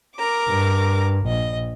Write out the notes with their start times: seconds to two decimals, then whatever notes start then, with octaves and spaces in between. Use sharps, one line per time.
0.16 A#4 A#5 D6
0.48 G2
1.27 A#1 D#5